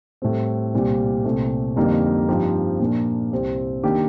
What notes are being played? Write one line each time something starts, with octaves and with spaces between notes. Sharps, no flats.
A2 G3 C4
C2 A#2 G3 C4
C2 A#2 A3 C4 G4
F2 D3 G3 A#3 D#4
G2 F3 C4 D#4 G4
A#2 F3 A#3 D4
C2 C3 G3 C4
D#3 A#3 D4 G4